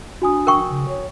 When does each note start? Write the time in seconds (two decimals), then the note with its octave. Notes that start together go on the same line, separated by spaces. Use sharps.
0.22 D4 F#4 G#5 D#6
0.47 A#4 G5 C#6
0.69 C#3
0.88 C#5